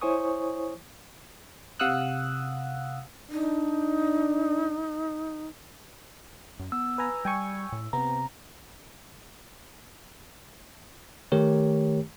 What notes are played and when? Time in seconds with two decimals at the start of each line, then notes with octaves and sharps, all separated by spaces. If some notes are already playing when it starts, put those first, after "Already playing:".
0.01 E4 C5 C#5 G#5 C#6 D#6
1.80 C3 F5 F#5 D#6 E6 F#6
3.31 D4 D#4
6.59 F#2
6.72 B3 E6
6.98 B4 G#5 A#5
7.25 G3 G5 G#5 C#6
7.72 A2
7.93 C3 B3 C4 A#5
11.32 D#3 A3 G4 A#4 C#5